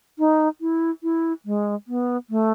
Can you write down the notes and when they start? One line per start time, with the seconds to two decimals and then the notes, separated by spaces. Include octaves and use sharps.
0.19 D#4
0.61 E4
1.03 E4
1.46 G#3
1.88 B3
2.30 A3